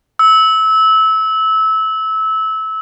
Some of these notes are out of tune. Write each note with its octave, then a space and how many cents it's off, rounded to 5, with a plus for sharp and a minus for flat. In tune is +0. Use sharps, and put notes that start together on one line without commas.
E6 -20